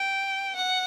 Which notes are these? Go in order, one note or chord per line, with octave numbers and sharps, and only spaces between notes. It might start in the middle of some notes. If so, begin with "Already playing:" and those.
Already playing: G5
F#5